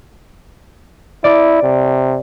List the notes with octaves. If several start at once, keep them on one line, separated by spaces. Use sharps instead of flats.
E4 D5
C3